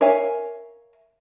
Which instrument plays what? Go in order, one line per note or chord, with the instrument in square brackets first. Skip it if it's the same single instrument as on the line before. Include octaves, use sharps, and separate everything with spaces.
[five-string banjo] A#4 C#5 E5 F5 G#5